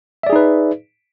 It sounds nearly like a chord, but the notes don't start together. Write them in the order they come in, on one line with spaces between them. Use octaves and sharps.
E5 D5 G#4 D#4 B4